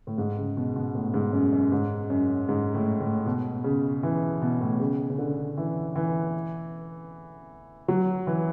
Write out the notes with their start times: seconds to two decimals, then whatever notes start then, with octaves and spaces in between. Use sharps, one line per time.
0.07 A2
0.18 G#2
0.37 C#3
0.57 B2
0.76 B2
0.95 A2
1.14 G#2
1.33 F#2
1.53 F#2
1.72 G#2
2.10 F#2
2.49 G#2
2.75 A2
3.00 A2
3.26 B2
3.64 C#3
4.03 E3
4.42 B2
4.61 A2
4.80 C#3
5.10 C#3
5.18 D3
5.57 E3
5.96 E3
7.88 F#3
8.27 E3